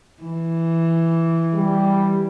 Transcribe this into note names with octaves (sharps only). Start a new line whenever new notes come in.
E3
G3